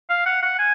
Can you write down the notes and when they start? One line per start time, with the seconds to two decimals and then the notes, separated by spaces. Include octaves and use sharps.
0.10 F5
0.26 F#5
0.43 F#5
0.59 G#5